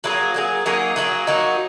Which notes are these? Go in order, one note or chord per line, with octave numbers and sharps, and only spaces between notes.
F#3 A#3 D#4 G#4
F#3 A#3 D#4 G#4
F#3 A#3 D#4 G#4
F#3 A#3 D#4 G#4
F#3 A#3 D#4 F#4